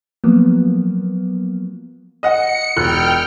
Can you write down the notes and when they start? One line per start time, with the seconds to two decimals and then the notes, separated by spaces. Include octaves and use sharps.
0.24 F3 F#3 A#3 B3
2.23 D#5 F#5 C#7
2.77 E1 G5 F6 F#6